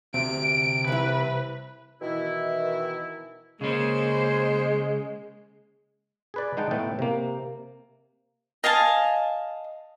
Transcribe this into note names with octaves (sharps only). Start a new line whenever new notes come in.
D2 C3 D7
C2 E3 B4
B2 D#3 E3 E4
C#3 G#3 A#3 C#4 C5
G#4 B4 D5
G#3 D#4 F#5 G5 A5
A2 A3 B3 G5 A5
C3 A#3
D#5 F5 G#5 A5